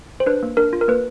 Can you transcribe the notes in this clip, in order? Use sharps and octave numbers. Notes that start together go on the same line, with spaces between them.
C5
D4 B4
A#3
D4 A#4
F4
A#4
A#3 B4